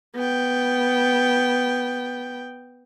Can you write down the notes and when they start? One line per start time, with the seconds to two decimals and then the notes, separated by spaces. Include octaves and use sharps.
0.15 B3 G5